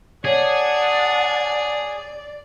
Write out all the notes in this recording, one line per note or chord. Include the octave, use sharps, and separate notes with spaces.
G#4 C#5 D5 F#5 A5